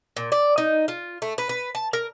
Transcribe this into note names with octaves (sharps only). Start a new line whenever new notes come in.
A#2
D5
D#4
F4
A3
B4
B4
A5
A#4